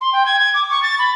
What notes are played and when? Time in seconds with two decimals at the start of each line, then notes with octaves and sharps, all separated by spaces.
0.01 C6
0.13 G5
0.26 G#6
0.39 G#6
0.54 D6
0.70 C#6
0.82 A6
0.99 B5